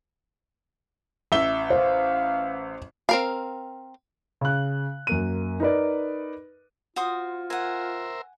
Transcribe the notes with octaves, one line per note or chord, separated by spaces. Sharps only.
A1 E5 G7
C5 F5
C4 A#4 F5
C#3 F#6
F#2 A#3 D#7
D#4 A#4 B4 D5
F4 F#4 C5 D#6
A#4 C5 E5 F#5 G#5